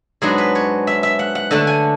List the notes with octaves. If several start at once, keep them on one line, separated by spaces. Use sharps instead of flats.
G#2 F#3 B3 D4 G#4
B4
C#5
E5
E5
F#5
F#5
D3 A3 D4 A5
G#5